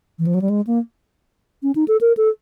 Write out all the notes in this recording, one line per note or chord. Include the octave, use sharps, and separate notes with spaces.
E3
F3
F#3
G3
G#3
A#3
C#4
D#4
A4
A#4
A4